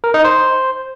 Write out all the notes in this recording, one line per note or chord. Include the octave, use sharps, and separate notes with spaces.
A#4
D#4
C5